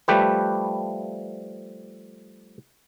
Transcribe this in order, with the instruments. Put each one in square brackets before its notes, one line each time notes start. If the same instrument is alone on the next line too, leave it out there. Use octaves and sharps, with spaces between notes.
[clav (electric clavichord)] F3 G3 A3 G4 B4